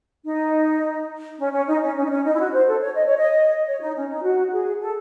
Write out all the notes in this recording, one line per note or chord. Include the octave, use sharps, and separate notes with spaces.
D#4
C#4
C#4
D#4
C#4
C#4
D#4
C#4
D#4
E4
F#4
C5
A4
C#5
D#5
C#5
D#5
C#5
D#4
C#4
D#4
F#4
G#4
A4